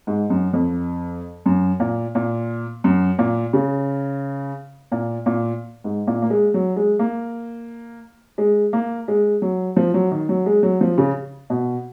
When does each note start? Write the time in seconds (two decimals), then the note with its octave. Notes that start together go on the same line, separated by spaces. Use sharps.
0.07 G#2
0.30 F#2
0.53 F2
1.46 F#2
1.80 A#2
2.15 A#2
2.84 F#2
3.18 A#2
3.53 C#3
4.92 A#2
5.26 A#2
5.84 G#2
6.07 A#2
6.22 A#3
6.30 G#3
6.54 F#3
6.76 G#3
6.99 A#3
8.38 G#3
8.73 A#3
9.08 G#3
9.42 F#3
9.76 F3
9.94 F#3
10.11 D#3
10.29 F#3
10.46 G#3
10.63 F#3
10.81 F3
10.98 C#3
11.50 B2